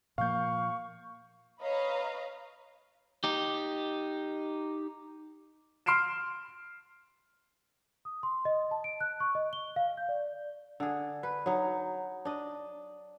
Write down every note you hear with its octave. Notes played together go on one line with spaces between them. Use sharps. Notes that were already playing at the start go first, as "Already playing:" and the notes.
A#2 F3 A#3 F5 C#6 G6
B4 C#5 D#5 F5 A#5 B5
D#4 G4
C6 F6 C7 D7 E7
D#6
C6
D#5
A5
D7
F#6
C#6
D#5
G7
F5
G6
D5
D3 G#4
B4
F#3 D#4
D4 D#5